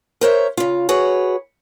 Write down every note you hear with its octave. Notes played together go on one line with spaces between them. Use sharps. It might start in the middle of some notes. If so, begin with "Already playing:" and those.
A#4 C5 C#5 E5
C#3 F4
F#4 G#4 B4 C#5